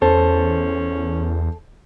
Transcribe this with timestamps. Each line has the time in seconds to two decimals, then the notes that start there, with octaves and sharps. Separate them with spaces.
0.02 E2 C#4 A4 C5